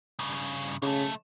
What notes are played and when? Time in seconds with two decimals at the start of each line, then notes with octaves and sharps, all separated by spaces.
0.19 G2 C#3
0.82 B1 C#3 A3